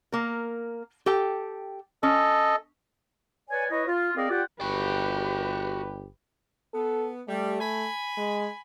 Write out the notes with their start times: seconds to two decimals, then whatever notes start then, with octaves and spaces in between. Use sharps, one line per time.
0.12 A#3 A#4
1.06 G4 A4 G5
2.03 C#4 A4 D#5
3.50 B4 C#5 D5 G#5
3.71 E4 B4 C#5 D#5
3.87 F4
4.16 C4 G#4 A#4 D5 D#5 F5
4.30 F4 G4 D5 F#5 G5
4.61 G1 F#4 G4 B4 G5
6.74 B3 A4
7.28 G3 A3
7.61 G#5 B5
8.17 G#3